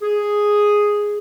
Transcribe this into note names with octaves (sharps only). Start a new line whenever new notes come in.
G#4